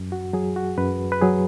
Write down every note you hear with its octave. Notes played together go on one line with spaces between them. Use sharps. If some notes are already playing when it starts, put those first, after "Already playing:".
Already playing: F#2
F#4
F#3 G#4
F#4
F#2 B4
B4
F#3 G#4